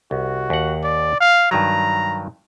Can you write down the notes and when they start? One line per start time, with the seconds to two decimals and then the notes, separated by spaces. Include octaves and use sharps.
0.11 C2 F#4
0.50 D#2 F#5
0.83 D5
1.20 F5
1.51 G2 D#3 F#3 A#5